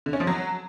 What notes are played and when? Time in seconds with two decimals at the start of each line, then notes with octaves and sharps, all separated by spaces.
0.06 D3
0.13 C#4
0.20 F3
0.27 F#3